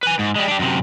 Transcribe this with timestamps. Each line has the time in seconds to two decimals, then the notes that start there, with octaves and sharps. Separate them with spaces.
0.03 B4 G#5
0.19 G#2
0.36 G3 G#3
0.48 D4 G4
0.59 F#2 C3